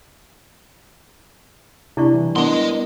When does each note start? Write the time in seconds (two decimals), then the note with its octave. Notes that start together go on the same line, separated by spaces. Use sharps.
1.97 C3 D4 E4 D5 C#6
2.14 E3 G3
2.36 B3 D4 A#4 D#5 C6